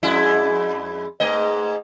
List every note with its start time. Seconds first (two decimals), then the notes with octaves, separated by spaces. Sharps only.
0.03 F2 G#3 E4
1.20 G#2 A3 D#5